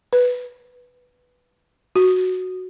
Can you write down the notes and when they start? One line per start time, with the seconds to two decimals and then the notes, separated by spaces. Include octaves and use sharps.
0.13 B4
1.96 F#4